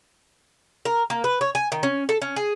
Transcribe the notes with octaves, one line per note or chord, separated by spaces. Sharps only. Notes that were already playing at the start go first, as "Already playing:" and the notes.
A#4
A#3
B4
C#5
G#5
D#3
C#4
A4
C#4
G#4